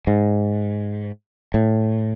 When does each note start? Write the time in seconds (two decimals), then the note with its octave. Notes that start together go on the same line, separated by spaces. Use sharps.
0.07 G#2
1.54 A2